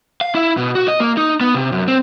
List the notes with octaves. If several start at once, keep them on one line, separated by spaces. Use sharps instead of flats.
F5
E4
B2
F#4
D#5
A#3
D#4
B3
C3
F#2
C4